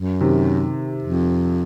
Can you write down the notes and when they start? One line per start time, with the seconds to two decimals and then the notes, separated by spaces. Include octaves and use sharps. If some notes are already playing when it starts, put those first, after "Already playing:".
Already playing: F#2
0.21 C3 D#3
1.02 F2